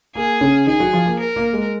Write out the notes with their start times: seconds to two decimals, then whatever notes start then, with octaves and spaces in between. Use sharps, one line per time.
0.15 A#3 G#4
0.41 C#3 C#4
0.66 D#3 D#4 G#4
0.80 F#3 F#4
0.93 F3 F4
1.06 A#3
1.19 A#4
1.36 A#3
1.53 G#3